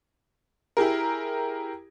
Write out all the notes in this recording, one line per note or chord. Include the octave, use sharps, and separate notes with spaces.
E4 G4 G#4 A#4